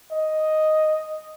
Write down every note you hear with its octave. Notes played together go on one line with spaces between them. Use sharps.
D#5